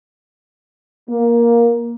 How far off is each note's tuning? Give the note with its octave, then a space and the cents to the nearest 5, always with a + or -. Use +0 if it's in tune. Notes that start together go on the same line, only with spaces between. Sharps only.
A#3 +10